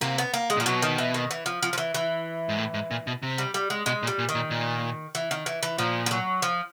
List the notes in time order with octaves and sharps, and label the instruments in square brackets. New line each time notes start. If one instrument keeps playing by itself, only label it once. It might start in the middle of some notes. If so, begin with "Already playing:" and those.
[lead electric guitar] C3 [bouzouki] A#3
[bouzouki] B3
A#3
G#3
[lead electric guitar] A#2 [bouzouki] F3
[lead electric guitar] B2 [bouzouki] F#3
[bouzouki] D#3
E3
D#3
E3
F3
F3
F3
E3
E3
[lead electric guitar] G#2
A2
G#2
A#2
B2
C3
[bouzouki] G3
G3
G#3
[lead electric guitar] B2 [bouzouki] G#3
[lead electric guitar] A#2
[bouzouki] G3
[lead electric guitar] A#2
[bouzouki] D#3
[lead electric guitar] A#2
A#2
[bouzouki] E3
D#3
E3
E3
[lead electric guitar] A#2 [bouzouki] F3
[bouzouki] F3
F#3
F3